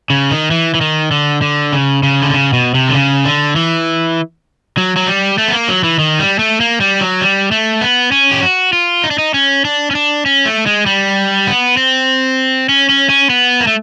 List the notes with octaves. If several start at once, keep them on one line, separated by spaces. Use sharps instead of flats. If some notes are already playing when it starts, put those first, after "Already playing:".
C#3
D#3
E3
E3
D#3
D3
D3
C#3
C#3
D3
C#3
B2
C3
D3
C#3
D3
E3
F#3
F#3
G3
A3
B3
A#3
F#3
E3
D#3
G3
A3
A#3
G3
F#3
G3
A3
B3
C#4
G4
F#4
F4
D#4
D4
D#4
C#4
D4
C#4
D4
C#4
A3
G#3
G3
B3
C4
C#4
C#4
C#4
B3
A#3
A3